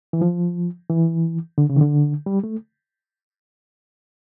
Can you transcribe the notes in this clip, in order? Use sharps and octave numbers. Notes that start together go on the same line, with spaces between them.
E3
F3
E3
D3
C#3
D#3
D3
G3
A3